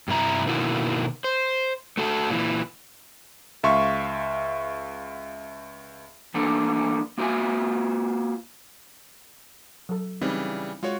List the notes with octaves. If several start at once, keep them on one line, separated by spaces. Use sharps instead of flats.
G2 C3 E4 A#5
B2 D3 D#3 A#3 E4 F#4
C5
A3 F#4 A4
A#2 D#3 E3
C#2 E5 F5 C6 C#6
E3 A3 A#3 D4 A4
A#3 F4 F#4 A#4 E5 G#5
F#3 A4
C#3 E3 G3 C4 D#4 E4
G#3 F4 F#4 C#5